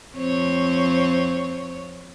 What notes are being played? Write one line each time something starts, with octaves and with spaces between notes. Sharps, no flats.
F2 C4 C#5